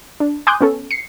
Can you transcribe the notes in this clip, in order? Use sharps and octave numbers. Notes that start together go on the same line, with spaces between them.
D4
G#5 C6 D6 D#6 F#6 G6
B3 C#4 A4
C7 C#7